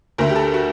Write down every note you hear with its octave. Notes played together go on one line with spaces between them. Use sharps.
D2 D3 A3 A#4
G4
A4
F#4